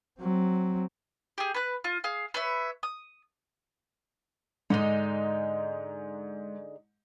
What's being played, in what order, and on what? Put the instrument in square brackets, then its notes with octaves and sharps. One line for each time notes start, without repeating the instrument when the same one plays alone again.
[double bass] F#3 C4
[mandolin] G4 G#4
B4 F#6
F4
G#4 F5
B4 C#5 E5
D#6
[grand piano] G#2 [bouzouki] D3 G#3 D#4